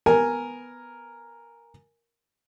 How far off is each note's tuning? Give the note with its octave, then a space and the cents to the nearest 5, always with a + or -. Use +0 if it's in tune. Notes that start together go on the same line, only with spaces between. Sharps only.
B3 +0 A#4 +0 G#5 +0